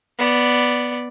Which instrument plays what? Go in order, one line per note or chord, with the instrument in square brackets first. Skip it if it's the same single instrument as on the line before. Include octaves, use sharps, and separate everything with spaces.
[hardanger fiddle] B3 D5